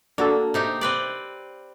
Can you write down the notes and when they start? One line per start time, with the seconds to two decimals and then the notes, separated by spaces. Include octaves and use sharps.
0.18 A#3 D4 F#4 A4
0.54 C3 D#4 G4
0.81 C4 B4 D5